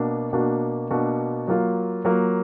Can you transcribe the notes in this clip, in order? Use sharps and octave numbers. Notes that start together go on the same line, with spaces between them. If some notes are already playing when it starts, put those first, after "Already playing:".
Already playing: B2 A#3 D4 F#4
B2 A#3 D4 F#4
B2 A#3 D4 F#4
F#3 A#3 F4
F#3 A#3 F4